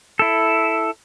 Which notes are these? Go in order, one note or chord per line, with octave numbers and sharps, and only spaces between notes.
E4 A4